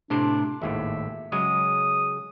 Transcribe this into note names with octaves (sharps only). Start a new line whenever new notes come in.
A2 C3 D4 C5
G#1 D#2 A2 E5
C#3 F#3 G#3 D#6